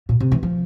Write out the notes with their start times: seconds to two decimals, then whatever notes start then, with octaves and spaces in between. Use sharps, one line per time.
0.09 A#2
0.20 C3
0.32 E3
0.43 F3